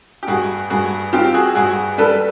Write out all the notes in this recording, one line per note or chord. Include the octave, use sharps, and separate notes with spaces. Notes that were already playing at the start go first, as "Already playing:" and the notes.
G4
G2 F#4 G#4
G2 F#4 G#4
C4 F4 G4
F#4 G#4
G2 F#4 G#4
G3 A4 B4